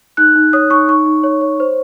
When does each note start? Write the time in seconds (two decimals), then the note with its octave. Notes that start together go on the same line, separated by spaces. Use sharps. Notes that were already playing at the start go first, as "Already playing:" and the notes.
0.17 D#4 F#6
0.35 D#4
0.53 C#5 D#6
0.70 D#4 C#6
0.88 D#4 C#6
1.06 D#4
1.24 C#5
1.41 C#5
1.60 C5